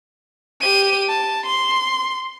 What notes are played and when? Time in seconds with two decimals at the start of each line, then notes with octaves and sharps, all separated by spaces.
0.61 G4 D#7
1.08 A5
1.45 C6